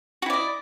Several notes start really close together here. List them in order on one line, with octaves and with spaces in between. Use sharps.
F#4 E4 D5 D#5